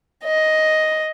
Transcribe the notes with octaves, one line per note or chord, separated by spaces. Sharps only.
D#5